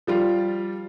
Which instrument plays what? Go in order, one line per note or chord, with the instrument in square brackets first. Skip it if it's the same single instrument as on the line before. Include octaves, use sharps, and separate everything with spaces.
[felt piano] F3 G3 F4